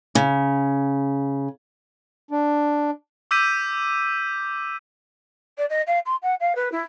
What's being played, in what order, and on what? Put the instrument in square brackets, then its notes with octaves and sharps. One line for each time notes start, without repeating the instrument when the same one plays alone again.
[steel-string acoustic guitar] C#3
[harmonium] D4
[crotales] D6 E6 G6 B6 D#7
[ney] D5
D#5
F5
C6
F#5
F5
B4
E4